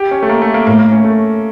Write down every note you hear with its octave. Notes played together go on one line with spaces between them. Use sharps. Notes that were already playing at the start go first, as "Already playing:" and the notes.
Already playing: G4
C#4
A3
A#3
A3
A#3
A2 A#3
A#3
C#4
A3